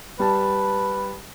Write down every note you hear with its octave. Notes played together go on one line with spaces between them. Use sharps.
G3 B4 A5